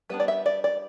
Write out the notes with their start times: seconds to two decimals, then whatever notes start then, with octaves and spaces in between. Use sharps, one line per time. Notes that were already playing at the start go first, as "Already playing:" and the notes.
0.10 G3 B3 D4 B4
0.20 D5
0.28 E5
0.46 D5
0.64 D5